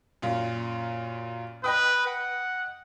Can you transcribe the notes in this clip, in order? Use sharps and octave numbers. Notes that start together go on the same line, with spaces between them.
F#2 A#2 F4
B4 D#5 G5 D#6
F#5